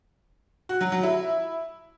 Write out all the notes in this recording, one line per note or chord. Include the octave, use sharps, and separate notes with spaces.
F#4
F#3
F#3
E4